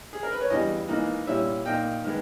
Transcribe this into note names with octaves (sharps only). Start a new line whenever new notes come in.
G#4
A#4
B4
C#5
E2 C#3 E3 G3 D#5
G#2 E3 A#3 D#4
A#2 G3 C#4 E4 E5
A#2 A#3 D#4 G5
D#3 G#3 B3